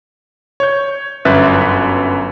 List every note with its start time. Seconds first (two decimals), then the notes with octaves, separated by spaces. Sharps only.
0.60 C#5 G6
1.25 G1 F#2 B4 E5 F#6 A6